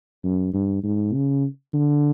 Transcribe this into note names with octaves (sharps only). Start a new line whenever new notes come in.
F#2
G2
G#2
C#3
D3